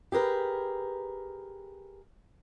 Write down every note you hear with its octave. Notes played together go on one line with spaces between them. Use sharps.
G4 G#4 A#4 B4